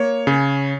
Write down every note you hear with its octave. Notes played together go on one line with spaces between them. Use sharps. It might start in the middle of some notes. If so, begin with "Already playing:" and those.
Already playing: A#3 C#5
C#3